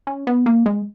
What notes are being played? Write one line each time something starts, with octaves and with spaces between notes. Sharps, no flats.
C#4
B3
A#3
G#3